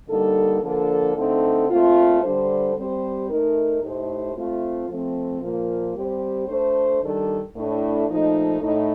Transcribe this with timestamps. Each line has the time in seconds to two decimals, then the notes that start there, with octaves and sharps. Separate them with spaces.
0.09 D3 G3 A#3 D#4 A4
0.62 D3 F3 A#3 D4 A4
1.16 D3 A3 C4 D#4 A4
1.69 A#2 A3 C4 F4
2.22 D3 G3 D4 A4 C5
2.75 G3 C4 G4 C5
3.29 A3 D#4 A#4
3.82 A2 A3 D#4 G4 C5
4.35 A3 C4 F4
4.88 F3 A3 C4
5.41 A#2 F3 A#3
5.95 G3 C4 G4 C5
6.48 A3 D4 A4 C5
7.01 D#3 G3 D4 A4
7.55 A2 A3 D4
8.08 A#2 F3 A3 D#4
8.61 A2 A3 D#4